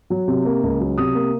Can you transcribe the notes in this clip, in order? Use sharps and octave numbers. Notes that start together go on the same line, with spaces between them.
F#3
C3
A#3
C#2
F#3
C3 D#6
A#3